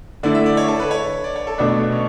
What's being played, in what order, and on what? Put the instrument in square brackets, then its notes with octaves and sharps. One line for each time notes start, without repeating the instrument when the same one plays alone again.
[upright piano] D3 A3 E4 [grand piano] D5
[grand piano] E5
D5
C#5
A4
B4
C#5
D5
C#5
A4
[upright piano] B2 A3 D4 [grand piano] B3
[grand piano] C#4